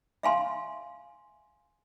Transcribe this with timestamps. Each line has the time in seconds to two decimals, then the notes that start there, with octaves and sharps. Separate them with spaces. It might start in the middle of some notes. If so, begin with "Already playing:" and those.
0.23 E5 F5 G#5 C6